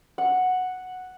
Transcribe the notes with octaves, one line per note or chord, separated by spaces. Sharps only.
F#5